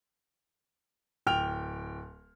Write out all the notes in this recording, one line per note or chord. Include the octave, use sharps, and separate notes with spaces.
D1 G5 F6 F7